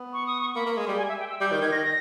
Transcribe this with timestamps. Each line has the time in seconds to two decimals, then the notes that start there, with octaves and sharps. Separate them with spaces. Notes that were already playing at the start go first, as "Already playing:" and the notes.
Already playing: B3
0.13 C#6
0.26 D#6
0.41 C#6
0.55 A#3 B5
0.66 A#3
0.77 G#3
0.88 G3
0.98 G#5
1.09 E5
1.20 G5
1.30 E6
1.41 G3 G6
1.51 D#3 G6
1.62 D#3 G#6
1.72 D#3 A#6
1.83 A#6